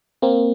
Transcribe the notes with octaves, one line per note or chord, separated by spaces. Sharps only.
A#3 C4